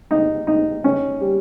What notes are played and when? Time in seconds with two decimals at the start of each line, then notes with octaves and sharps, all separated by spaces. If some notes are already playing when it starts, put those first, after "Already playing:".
0.11 D#4
0.47 D#4
0.84 C#4
1.21 G3